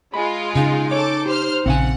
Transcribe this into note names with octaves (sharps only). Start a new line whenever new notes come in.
G#3 F4 B5
C#3 D#4
A4 C#5 D6
G4 C5 F6
A#1 C#3 C4 F5 F#5 G#5